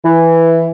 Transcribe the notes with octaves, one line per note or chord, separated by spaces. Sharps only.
E3